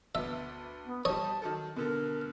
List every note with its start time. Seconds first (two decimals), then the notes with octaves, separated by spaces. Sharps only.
0.15 D2 B3 E5
0.86 B3
1.05 G3 D#4 C#5 A5 D#6
1.42 D#3 F#3 A4
1.76 B2 D3 A4 A#4